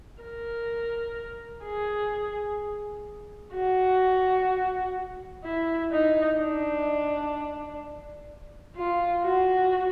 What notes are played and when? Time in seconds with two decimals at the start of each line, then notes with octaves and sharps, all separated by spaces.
0.22 A#4
1.64 G#4
3.54 F#4
5.44 E4
5.92 D#4
6.40 D4
8.77 F4
9.24 F#4